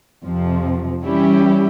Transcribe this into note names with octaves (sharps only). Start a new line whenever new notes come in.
F2 C3 F3
E3 G3 C#4 E4 G4